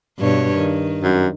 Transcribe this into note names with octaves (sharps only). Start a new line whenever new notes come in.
G2 B2 C#5
D#3
F#2